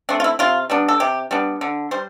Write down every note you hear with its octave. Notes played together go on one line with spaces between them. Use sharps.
A3 C4 D4
F4
E4
C3 F4
G3 B3 D4
A4
C3 G4
G3 B3 D4
D3
G3 C5